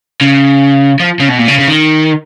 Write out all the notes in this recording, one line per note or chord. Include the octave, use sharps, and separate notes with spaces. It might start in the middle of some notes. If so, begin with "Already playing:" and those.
C#3
F3
C#3
B2
A#2
C#3
C#3
D#3